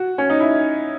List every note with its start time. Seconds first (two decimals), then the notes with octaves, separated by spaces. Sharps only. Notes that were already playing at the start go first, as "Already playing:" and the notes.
Already playing: F#4
0.18 C#4
0.30 D#4
0.40 E4